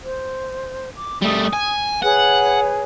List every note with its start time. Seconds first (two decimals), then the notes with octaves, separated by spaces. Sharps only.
0.01 C5
0.93 D6
1.22 G3 A3 D#6
1.53 G#5
2.02 G#4 B4 C#5 F#5